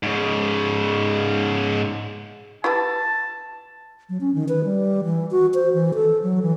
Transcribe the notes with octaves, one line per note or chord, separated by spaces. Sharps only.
G#2 C#3
E4 G4 B4 A5
F#3
C#4
D#3
B4
G3
E3
F#4
C5
E3
A4
F#3
E3